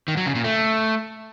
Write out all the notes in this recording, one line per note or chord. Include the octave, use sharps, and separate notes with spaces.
D#3
F#3
C#3
A#2
A3